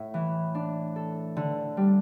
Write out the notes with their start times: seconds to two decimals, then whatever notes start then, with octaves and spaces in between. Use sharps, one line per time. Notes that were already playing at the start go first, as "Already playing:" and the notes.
Already playing: A2 A3 E4
0.14 E3
0.55 D4
0.96 A4
1.37 D3
1.77 G3